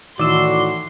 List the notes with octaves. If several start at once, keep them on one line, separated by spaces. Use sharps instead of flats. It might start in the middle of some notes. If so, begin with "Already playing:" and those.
A2 D#3 E3 D#4 F#4 D5 C6 E6